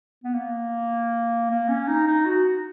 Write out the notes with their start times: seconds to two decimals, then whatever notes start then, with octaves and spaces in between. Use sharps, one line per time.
0.24 B3
0.35 A#3
1.50 A#3
1.68 C#4
1.88 D#4
2.07 D#4
2.26 F#4